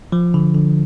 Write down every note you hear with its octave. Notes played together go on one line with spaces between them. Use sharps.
F3
D3
D3